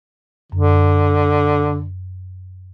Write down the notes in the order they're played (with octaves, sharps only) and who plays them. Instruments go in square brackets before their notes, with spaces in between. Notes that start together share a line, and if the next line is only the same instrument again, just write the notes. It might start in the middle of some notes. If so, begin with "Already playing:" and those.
[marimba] F#2 [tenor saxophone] D3